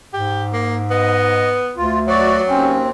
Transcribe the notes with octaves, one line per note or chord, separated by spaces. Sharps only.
G#2 G4
A#3
B3 D#5
D2 F4
F#3 F#4 D5
D#2 C4 C#4